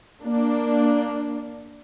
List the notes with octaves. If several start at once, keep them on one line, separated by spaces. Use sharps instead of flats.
A#3 D4